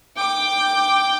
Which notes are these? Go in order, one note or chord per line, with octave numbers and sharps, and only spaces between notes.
G5 D6